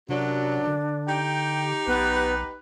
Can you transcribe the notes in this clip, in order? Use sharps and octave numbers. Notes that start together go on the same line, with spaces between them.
F#2 C3 F#3 D4
D3
D#4 G4 G5
B1 B3 B4